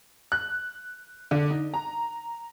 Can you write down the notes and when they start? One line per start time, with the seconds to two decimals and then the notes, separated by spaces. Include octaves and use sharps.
0.32 F#6
1.31 D3
1.50 D#4
1.74 A#5